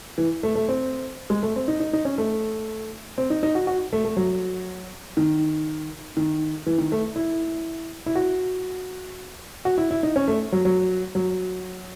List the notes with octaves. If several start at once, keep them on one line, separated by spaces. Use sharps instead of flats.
E3
A3
A3
C4
G#3
A3
C4
D#4
D#4
D#4
C#4
A3
C4
D#4
D#4
F#4
F#4
A3
A3
F#3
D#3
D#3
E3
D#3
A3
E4
E4
F#4
F#4
E4
E4
D#4
C#4
A3
F#3
F#3
F#3